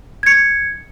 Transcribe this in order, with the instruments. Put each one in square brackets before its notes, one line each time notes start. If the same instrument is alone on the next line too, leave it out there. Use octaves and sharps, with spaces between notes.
[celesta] G#6 C#7